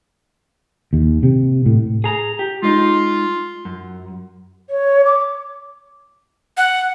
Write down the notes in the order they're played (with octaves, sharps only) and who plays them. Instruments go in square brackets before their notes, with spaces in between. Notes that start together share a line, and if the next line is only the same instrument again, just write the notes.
[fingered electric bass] D#2
C3
A2
[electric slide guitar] G#4 A#5
G4
[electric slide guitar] G#3 D#4 [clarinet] F4
[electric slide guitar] F#2
[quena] C#5
D6
F#5